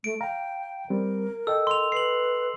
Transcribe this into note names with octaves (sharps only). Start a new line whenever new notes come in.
A3 D7
F5 G5 A#5
G3 C4 A#4
A4 D#5 G5 E6
C6 F7
B4 C7 F#7